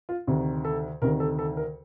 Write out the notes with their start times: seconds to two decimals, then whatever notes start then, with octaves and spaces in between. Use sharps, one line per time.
0.09 F4
0.27 D2 C3 D#3
0.64 A4
1.02 D2 C3 D#3 A#4
1.20 A4
1.39 A4
1.57 A#4